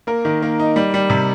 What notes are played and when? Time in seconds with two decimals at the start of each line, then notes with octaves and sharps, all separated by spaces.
0.07 A#3 A#4
0.25 D#3
0.42 A#3
0.60 D#4
0.76 G3
0.94 G3
1.10 C3